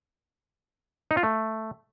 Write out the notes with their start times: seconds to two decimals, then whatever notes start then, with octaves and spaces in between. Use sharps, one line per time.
1.11 D#4
1.17 F4
1.23 A3